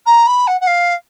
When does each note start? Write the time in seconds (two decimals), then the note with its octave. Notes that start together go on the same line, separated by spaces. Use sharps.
0.06 A#5
0.27 B5
0.47 F#5
0.61 F#5
0.67 F5